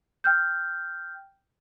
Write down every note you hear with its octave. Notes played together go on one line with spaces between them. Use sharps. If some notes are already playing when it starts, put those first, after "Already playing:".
G5 F6 G6